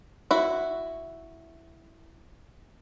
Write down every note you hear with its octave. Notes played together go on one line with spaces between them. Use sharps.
E4 F#4